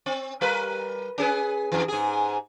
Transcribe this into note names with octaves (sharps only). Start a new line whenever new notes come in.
C4
G3 A#4 B4
C#4 G#4 B4
F2 E3
G#2 G#4